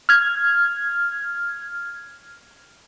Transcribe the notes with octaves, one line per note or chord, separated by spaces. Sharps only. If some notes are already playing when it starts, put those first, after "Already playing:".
F6 G#6